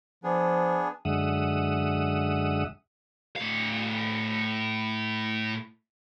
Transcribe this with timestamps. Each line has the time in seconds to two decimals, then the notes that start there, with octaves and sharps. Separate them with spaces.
0.24 F3 B3 D4 G#4
1.05 F#2 D3 G#3 E5 F#5 D#6
3.36 A2 F5